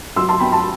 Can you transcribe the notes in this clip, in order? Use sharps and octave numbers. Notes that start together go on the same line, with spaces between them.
F#3 C6 E6
A5 C6
B3 G5 B5
A5 C6